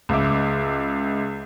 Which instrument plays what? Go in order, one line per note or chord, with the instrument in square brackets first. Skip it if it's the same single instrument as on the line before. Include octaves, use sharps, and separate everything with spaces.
[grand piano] C#2 E5 D6